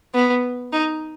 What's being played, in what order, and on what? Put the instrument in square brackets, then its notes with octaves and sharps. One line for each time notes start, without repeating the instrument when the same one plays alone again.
[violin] B3
D#4